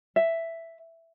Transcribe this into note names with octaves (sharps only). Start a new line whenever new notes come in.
E5